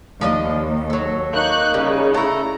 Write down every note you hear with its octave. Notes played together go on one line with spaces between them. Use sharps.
D#2 F3 D4 D#5
F#3 A4
A#3 D#4 C#6 F#6 G6
C#3 G3
A3 E4 A#5